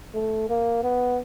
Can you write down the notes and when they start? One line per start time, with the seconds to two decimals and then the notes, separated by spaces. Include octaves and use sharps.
0.14 A3
0.49 A#3
0.83 B3